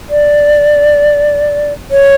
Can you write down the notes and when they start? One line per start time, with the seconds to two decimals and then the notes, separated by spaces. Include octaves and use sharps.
0.10 D5
1.91 C#5